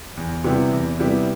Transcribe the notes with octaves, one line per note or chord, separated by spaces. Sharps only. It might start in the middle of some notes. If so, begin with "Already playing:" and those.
E2
C3 G3 B3 E4
E2
C3 G3 B3 E4